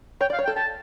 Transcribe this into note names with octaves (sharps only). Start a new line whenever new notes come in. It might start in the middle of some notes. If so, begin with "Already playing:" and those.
C#5 G5
D5
F5
C#5
G5
A4
G4 A5